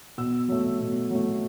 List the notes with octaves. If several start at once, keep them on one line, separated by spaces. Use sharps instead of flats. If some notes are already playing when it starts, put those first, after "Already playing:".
B2 E6
F#3 A3
B2
F#3 A3